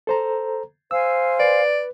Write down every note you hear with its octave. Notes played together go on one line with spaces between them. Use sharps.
A4 C5 A#5
C5 F5 G#5 E6
B4 D5